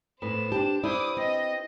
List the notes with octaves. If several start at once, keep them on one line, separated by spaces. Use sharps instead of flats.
A2 B3 C5 E7
D4 G4 A5
E4 B4 C5 D5 D6 D#6
C4 D#5